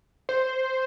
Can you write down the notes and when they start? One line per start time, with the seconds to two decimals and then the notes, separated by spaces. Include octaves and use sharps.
0.29 C5